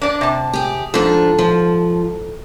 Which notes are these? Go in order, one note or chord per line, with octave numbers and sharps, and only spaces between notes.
D4 D5
C3 A5
G4 G#4
G#2 F3 D4 A4
F3